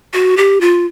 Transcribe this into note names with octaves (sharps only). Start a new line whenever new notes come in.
F#4
G4
F4